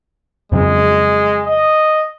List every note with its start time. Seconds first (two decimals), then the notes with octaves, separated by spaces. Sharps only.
0.52 F2 C#3 F#3 G#3
1.47 D#5